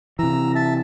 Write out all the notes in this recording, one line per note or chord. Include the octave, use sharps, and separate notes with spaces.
C3 E3 A#5 E6
E5 A5